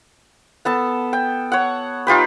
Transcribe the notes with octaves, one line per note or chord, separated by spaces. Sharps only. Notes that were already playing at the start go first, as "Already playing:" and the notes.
B3 A4 A5
G5
C#5 F#5
D#4 F4 G4 B4